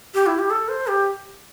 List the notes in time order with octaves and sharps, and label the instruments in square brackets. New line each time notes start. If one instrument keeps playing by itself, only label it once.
[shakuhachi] G4
E4
G4
A4
C5
G4